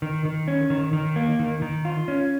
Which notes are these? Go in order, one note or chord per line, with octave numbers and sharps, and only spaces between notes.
D#3
D#3
C#4
D#3
D#3
A#3
D#3
D#3
F4
C#4